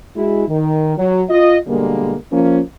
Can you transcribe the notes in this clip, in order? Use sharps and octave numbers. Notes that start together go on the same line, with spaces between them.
G#3 E4 F#4
D#3
F#3
F4 D#5
B2 D3 G3 G#3 A#3
F3 A#3 C#4